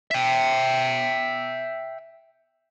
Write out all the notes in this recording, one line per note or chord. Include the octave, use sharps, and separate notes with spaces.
E5 G5